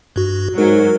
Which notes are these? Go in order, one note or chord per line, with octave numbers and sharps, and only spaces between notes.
G2 F#4
G#2 F#3 A#4